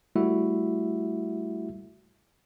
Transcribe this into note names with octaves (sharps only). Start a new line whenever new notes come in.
G3 A3 E4 F#4 E5